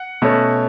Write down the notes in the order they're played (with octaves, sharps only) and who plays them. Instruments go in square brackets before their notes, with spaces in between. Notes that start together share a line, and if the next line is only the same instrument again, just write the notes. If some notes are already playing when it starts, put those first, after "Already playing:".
Already playing: [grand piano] F#5
B2 A3 C#4